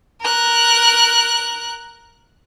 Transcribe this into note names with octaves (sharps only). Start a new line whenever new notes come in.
A#4 F#6